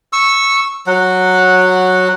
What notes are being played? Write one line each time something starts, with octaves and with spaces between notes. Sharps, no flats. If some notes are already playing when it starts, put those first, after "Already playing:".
C#6 E6
F#3 F#5